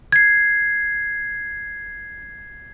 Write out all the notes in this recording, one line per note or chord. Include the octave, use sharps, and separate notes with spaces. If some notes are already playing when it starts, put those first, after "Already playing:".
G#6 C7